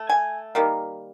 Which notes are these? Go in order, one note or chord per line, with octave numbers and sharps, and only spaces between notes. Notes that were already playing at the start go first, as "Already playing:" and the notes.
Already playing: A3
G#5
D#3 G3 A#3